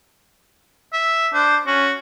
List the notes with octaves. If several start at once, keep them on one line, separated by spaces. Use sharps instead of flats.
E5
D4 C5
C#4 F#4